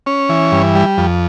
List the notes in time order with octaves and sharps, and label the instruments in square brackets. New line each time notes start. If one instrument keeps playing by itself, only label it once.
[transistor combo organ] C#4
E3
G2
G3
F2